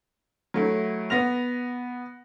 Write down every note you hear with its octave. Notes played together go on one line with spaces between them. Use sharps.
F#3 A3 E4
B3 A#6 F7